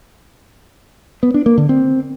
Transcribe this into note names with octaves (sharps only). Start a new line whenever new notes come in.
B3
D4
A#3
D3
C4